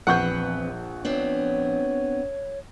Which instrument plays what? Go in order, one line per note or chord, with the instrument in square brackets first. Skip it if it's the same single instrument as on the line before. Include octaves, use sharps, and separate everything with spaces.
[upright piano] A#1 C#6 G6 [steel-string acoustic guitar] E2 C4 B4 [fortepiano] F#5
[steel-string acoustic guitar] B3 C4 D4 [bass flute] C#5